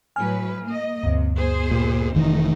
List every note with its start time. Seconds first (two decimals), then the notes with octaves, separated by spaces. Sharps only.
0.16 A2 F#3 B4 G#5 F6
0.64 A#3 D#5
1.03 D2 G2 C3
1.37 B2 G#4 C5
1.71 A#2
2.14 F1 D#3 E3 A3 D#4